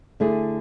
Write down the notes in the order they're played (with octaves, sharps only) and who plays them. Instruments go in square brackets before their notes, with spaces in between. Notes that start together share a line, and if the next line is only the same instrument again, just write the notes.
[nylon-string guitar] D3 A3 E4 G#4